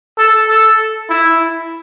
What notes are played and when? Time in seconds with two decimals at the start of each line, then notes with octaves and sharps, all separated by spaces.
0.18 A4
0.48 A4
1.10 E4